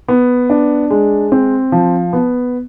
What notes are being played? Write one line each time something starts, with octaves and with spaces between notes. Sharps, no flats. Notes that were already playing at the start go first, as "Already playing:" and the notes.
B3
D4
G#3
C4
F3
B3